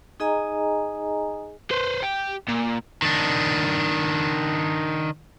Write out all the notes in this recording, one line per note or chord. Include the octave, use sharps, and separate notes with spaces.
D#4 G#4 D#5 G#5 A#5
B4 C5
G4
A#2
D#3 D4